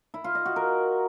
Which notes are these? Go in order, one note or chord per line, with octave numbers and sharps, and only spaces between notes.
E4
F4
D#5
F#4
A#4